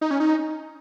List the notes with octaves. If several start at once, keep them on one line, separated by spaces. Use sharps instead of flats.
D#4
C#4
D#4